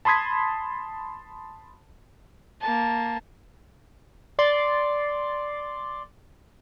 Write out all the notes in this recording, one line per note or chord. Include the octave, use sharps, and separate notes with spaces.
A5 B5 C6 D#6 G#6 B6
A#3 A5
D5 C6 A6